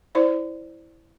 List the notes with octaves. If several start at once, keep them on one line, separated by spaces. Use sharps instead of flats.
E4 C5 D5